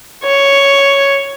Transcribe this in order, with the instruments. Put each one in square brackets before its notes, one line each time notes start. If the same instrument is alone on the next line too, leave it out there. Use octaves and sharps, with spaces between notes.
[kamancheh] C#5